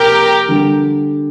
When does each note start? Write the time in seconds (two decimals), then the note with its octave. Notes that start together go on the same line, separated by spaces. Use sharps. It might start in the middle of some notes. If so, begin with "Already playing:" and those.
Already playing: C3 F3 A#3 G4 A#4
0.48 D3 G3 D4